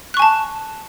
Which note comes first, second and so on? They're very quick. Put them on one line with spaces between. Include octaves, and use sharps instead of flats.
F#6 C#6 G#5 A5